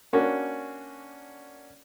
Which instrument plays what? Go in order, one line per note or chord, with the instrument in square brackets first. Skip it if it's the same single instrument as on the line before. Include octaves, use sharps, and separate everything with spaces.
[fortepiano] A#3 C#4 D4 F#4